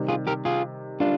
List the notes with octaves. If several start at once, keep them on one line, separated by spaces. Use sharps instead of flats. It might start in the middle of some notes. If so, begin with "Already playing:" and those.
Already playing: C3 D#3 G3
F4 G#4
G4 A#4
F4 G#4
D3 G3 A#3 D4 F4